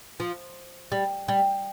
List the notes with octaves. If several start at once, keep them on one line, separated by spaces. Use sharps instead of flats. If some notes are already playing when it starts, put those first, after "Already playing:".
F3
G3
G3